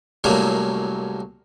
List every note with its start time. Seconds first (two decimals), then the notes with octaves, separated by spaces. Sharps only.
0.24 C2 F#2 A2 F#3 A#3